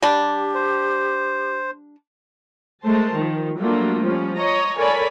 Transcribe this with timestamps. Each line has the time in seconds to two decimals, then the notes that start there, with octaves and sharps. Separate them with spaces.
0.02 G3 D4 G4
0.55 C5
2.85 G#3 A3 A#4 C5 A5
3.15 D#3 F3
3.59 F#3 G3 A3 A#3 D4 F4
4.01 F3 G3 C#4
4.37 C#5 D#5 A#5
4.77 A4 A#4 C#5 D5 G#5 B5